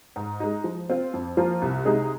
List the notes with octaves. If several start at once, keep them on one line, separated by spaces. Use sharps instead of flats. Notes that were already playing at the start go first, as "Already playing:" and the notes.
G#2
G#3 D#4
F3
C4 F4
F2
F3 A#3 F4 C5
C2
C3 G#3 D#4 G#4